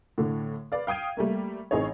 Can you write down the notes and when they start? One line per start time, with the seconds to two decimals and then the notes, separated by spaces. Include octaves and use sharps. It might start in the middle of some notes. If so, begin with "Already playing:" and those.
0.18 A2 D3
0.72 B4 D5 F5
0.87 F5 G5 D#6 G#6 D#7
1.17 G3 A3 A#3
1.71 A1 C4 D#4 G#4 C#5